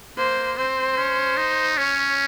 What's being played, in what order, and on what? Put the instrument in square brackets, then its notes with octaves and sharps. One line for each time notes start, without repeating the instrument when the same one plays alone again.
[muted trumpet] A#3 [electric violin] C5
[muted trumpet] C4 [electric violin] C5
[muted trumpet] C#4
D#4
[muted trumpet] C#4 [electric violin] C#5